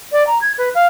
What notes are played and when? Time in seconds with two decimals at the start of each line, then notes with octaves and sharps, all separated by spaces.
0.12 D5
0.27 A#5
0.41 G#6
0.58 B4
0.75 F5